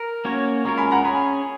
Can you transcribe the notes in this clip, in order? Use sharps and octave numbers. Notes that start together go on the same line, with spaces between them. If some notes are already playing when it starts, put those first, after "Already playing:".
Already playing: A#4
A#3 C#4 F#4 C#5
G#3 C#4 F4 A#4 A#5 C#6
G#5 B5
F#5 A#5
C#4 G#4 C#5 G#5 B5